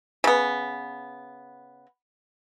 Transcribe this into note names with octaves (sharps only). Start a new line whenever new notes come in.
C#3 B3